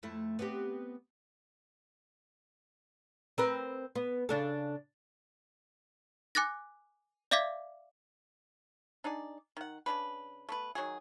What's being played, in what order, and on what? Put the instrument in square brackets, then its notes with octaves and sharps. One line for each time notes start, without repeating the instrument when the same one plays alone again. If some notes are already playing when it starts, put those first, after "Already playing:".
[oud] F2 A3 E4
B3 C4 G4
C4 A#4 B4
B3
C#3 D4 A4
[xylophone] G#5 D6 F#6 A6 A#6
D5 E5 F5 D6 G#6 B6
[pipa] D4 D#4 G#4 D5
D#3 F#5
C#3 G3 D4 B4
A3 B3 B4
D#3 F#3 F#4 G#4